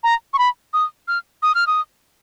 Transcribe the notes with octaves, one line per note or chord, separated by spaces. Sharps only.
A#5
C#6
B5
D#6
F6
D#6
F6
D#6